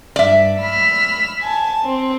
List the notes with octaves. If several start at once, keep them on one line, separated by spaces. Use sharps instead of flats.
G2 D5 E5
B5 E6 F6
G#5 A5
C4